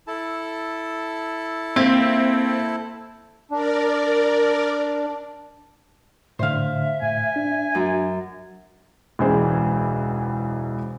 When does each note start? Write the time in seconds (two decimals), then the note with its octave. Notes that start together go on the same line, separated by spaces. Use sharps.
0.07 E4 A4 A5
1.76 A#3 C4 E5 G#6
3.51 D4 A#4 D5
6.39 A2 D3 C5 E5 F5
7.02 A2 G#5
7.36 D4
7.75 F#2
9.19 E1 C#2 E3 G#4 C5